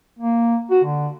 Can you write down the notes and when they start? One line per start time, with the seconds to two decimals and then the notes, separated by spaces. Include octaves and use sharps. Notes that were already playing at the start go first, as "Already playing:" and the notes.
0.19 A#3
0.71 F#4
0.84 D3